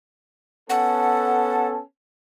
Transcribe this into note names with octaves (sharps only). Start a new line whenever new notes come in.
B3 C#4 A4 F#5